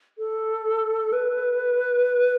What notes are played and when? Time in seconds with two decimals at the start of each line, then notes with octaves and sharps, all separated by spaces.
0.18 A4
1.12 B4